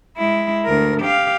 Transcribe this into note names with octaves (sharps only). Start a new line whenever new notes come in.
G#3 E4
D2 A#4
G4 F5